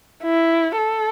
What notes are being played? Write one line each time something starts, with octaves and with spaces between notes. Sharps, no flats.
E4
A4